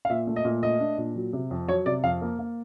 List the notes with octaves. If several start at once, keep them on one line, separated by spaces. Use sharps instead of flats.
F5
A#2 E5
A3
D#5
A#2
A3 D#5
D4
A#2
F#3
C3
F2
F#3 C#5
C3 D5
F2 F5
A#3
A#3